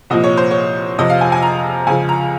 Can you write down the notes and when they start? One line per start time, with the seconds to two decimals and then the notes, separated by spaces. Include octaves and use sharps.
0.10 C2 A#2 F3 D#5
0.24 C#5
0.37 C5
0.51 C#5
0.99 F2 C3 F3 D#5
1.10 F5
1.21 G#5
1.32 G#5
1.42 A#5
1.87 C#2 C#3 F3 G#5
2.09 A#5